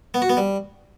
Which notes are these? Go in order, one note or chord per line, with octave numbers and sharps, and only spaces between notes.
B3
F#4
B3
G3